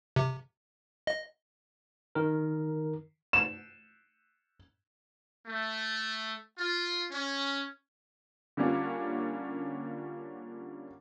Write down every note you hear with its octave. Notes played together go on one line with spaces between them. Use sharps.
C3
D#5
D#3 A#4
E7
A3
F4
C#4
D3 G3 A#3 C#4 D4 F4